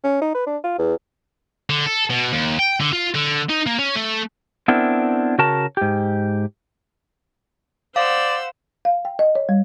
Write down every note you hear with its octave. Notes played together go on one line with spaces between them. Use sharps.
C#4
D#4
B4
D4
F4
E2
D3
A4
B2
D#2
G5
D3
F4
D3
D#4
A#3
C#4
A3
B3 C4 D4 E4 A#4
C#3 F#4 A#4 A5
G#2 G4
C5 D5 F5 F#5 E6
F5
G5
D#5
C#5
G3